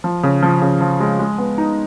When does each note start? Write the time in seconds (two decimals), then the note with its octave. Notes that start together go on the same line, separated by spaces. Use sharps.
0.04 F3
0.23 C#3
0.43 F3
0.62 C#3
0.81 F3
1.00 G#3
1.19 G#3
1.38 B3
1.58 D#4